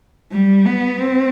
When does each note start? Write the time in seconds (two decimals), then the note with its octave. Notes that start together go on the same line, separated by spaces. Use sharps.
0.32 G3
0.66 B3
1.00 C4